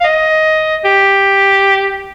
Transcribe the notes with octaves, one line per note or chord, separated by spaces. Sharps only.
F5
D#5
G4